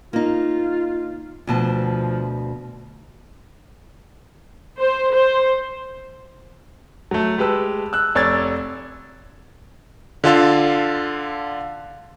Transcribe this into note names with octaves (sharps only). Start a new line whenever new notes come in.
A#3 D#4 F4
D2 B2 F3 A5
C5
C5
F#3 A3
G#3 G4 B4 A5 E6
E6 F#6
F1 C#5 D5 E6 G#6 A6
D3 F4 A4 F5